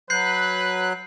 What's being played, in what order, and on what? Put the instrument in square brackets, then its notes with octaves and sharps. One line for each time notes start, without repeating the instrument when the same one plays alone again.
[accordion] F#3 F#6 [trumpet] B4 [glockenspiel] G6 C7